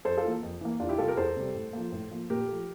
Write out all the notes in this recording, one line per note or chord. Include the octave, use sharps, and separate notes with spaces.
F2 A4 C5
F4 A4
E3 A#3
F2
E3 A#3
E2 D4 F4
E4 G4
C3 G3 F4 A4
G4 A#4
E2 A4 C5
C3 G3
A2
F3 A#3
A2
F3 A#3
A#2 G4 A#4
F3 A3